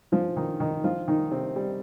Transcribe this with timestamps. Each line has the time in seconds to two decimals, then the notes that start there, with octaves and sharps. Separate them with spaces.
0.12 F3 F4
0.36 D#3 D#4
0.60 D#3 D#4
0.84 F3 F4
1.08 D#3 D#4
1.31 C3 C4
1.56 G3